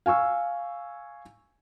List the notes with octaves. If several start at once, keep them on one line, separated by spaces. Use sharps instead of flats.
F5 G#5 C#6 E6